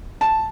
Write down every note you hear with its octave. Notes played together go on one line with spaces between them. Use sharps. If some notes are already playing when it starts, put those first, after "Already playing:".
A5